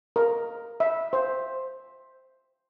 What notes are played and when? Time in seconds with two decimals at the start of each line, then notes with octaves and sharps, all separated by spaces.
0.16 A#4
0.80 E5
1.13 C5